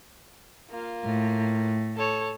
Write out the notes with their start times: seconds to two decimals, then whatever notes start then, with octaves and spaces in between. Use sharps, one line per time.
0.71 A#3 F4
1.05 A2
1.96 A4 C#5